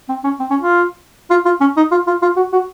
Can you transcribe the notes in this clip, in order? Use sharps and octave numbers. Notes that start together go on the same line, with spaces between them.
C4
C#4
C4
C#4
F4
F4
F4
C#4
D#4
F4
F4
F4
F#4
F#4